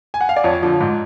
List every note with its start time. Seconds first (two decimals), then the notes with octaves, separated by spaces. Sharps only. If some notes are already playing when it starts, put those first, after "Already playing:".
0.14 G#5
0.21 F#5
0.29 F5
0.37 D5
0.44 F2 C#5
0.62 D3 F3
0.80 G#2